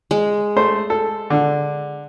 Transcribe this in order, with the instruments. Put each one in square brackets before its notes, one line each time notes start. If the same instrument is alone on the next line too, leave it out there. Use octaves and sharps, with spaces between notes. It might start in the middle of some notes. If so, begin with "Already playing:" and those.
[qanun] G#3
[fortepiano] A3 C5
A4
D3